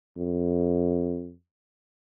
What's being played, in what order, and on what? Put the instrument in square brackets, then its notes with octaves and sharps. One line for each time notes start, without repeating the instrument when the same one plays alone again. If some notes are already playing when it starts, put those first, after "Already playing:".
[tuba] F2